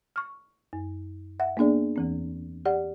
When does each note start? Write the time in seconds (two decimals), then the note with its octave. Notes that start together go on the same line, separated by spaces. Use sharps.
0.16 C#6 F6
0.73 F#2
1.40 E5 F#5
1.57 A#3 B3 D4 G#4 D5
1.96 E2 E3 C4
2.65 G4 D5 F#5